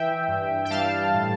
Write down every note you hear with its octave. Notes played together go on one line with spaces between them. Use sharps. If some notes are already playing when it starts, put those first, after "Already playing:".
Already playing: E3 E5 G5
G2
G5
G3 F5 A5
A2